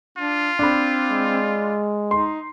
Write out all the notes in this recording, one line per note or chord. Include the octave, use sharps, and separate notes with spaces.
D4 F4
C4 D4 B5
G#3
D#4 C6